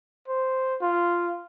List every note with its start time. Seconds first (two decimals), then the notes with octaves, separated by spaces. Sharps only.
0.28 C5
0.81 F4